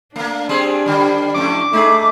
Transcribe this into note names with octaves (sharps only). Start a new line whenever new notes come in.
A3 A#3 D4
G3 C4 G#4
D3 G3
F2 A2 A3 D6
A3 D#4 G#4